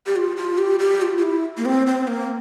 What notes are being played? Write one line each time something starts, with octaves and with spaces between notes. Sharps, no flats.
G4
F4
F4
G4
G4
F4
F4
E4
A#3
C4
C4
A#3